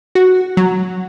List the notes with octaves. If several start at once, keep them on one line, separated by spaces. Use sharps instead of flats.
F#4
F#3